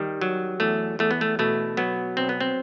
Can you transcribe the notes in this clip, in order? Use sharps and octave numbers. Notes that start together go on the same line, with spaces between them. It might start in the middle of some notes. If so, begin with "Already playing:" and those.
Already playing: D#3 G3
F#3
E2 A3
E2 A3
B3
A3
B2 A3
F#3 B3
B1 C4
B3
C4